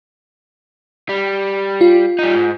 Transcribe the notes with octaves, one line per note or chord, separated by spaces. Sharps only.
G3
F4
G3 D#4
G#2